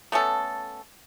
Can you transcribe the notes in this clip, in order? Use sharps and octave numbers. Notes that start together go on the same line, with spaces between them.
A3 B3 C#4 A4